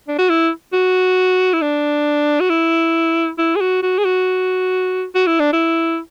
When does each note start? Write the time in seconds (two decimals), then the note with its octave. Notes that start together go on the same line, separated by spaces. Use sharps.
0.08 D4
0.19 F#4
0.30 E4
0.73 F#4
1.53 E4
1.62 D4
2.40 F#4
2.50 E4
3.38 E4
3.56 G#4
3.61 F#4
3.83 F#4
3.98 G#4
4.05 F#4
5.15 F#4
5.27 E4
5.39 D4
5.53 E4